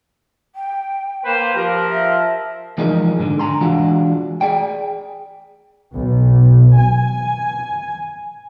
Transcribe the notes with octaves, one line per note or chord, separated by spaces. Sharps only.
G5
A#3 B4 C5
F3 G4 A#4
E5
E3 F3 G#3 D#4 G#4 A#4
G#2 D3
D3 A#5 C6
E3 G#3 D4 F4 F#4
G#4 D5 G5
B1
G#5